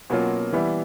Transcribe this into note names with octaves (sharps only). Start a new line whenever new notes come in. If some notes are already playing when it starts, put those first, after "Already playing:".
B2 F#3 A#3 C#4 F4
E3 G3 B3 E4